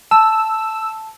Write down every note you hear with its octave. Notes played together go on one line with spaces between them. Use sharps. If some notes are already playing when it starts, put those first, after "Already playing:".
A5 E6